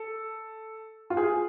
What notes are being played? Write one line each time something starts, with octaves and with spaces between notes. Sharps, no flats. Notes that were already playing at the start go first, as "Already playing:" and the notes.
Already playing: A4
F4
G#4